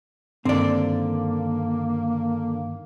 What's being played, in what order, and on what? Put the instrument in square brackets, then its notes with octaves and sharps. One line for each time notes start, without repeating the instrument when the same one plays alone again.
[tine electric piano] G2 D#3 [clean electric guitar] D3 [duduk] A#3 [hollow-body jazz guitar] C4 D5